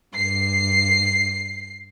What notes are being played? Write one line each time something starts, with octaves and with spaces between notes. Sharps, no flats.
G2 C7